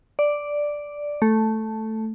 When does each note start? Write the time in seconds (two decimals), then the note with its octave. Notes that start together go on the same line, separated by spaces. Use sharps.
0.19 D5
1.22 A3